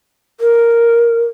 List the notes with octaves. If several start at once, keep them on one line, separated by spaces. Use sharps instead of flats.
A#4